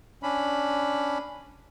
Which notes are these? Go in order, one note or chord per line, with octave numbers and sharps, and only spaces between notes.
C#4 D4 B5